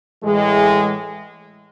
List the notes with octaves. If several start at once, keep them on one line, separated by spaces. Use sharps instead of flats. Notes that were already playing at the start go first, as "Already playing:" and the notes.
A2 E3 G#3